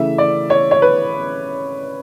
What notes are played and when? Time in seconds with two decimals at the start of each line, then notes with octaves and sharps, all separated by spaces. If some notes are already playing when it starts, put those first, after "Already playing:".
Already playing: C#3 E3 A3 E5
0.18 D5
0.50 C#5
0.71 C#5
0.82 B4